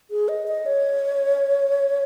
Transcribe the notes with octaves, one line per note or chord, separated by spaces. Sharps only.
G#4
D#5
D#5
C#5